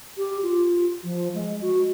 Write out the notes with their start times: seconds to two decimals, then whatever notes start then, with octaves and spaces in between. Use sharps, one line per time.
0.18 G4
0.43 F4
1.04 F3
1.34 G#3
1.61 F#4